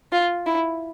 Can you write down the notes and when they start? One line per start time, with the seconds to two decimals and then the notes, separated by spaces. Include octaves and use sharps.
0.12 F4
0.46 E4